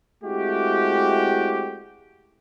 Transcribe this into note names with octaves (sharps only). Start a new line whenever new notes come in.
G#3 A3 C4 E4 F#4 G4